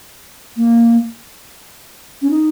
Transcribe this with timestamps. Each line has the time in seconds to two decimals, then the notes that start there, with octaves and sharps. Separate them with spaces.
0.57 A#3
2.22 C#4
2.30 D#4